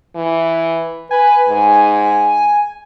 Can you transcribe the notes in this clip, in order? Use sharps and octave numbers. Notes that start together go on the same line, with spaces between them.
E3
B4 G#5
G#2